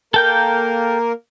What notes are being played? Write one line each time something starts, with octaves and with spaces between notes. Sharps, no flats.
A#3 A4 A#4 G5 G6